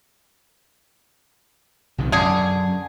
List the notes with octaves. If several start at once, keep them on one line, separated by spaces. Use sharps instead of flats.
B1 C3 D#3
F#2 D3 G#4